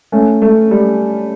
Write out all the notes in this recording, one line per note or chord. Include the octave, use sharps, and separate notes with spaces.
A3 C#4
A3
G3